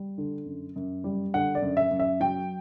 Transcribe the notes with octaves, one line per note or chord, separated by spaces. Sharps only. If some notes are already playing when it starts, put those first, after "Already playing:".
Already playing: G3
D3
F#2
F#2
G3
D3 F#5
D5
F#2
E5
F#2
E5
F#3 G5